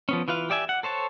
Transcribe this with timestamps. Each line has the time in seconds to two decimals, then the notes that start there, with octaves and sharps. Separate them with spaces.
0.09 F3 B3 C#4
0.28 E3 F4 B4 F5
0.50 G4 D5 E5 G#5
0.69 F#5
0.83 A4 C5 C#5 A5